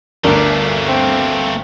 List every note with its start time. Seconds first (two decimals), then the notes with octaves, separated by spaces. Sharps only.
0.24 G1 D2 A3 A#3 D4 A#4
0.86 C4